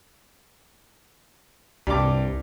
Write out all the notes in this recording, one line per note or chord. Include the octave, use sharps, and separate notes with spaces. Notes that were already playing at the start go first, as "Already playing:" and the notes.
C2 G2 D6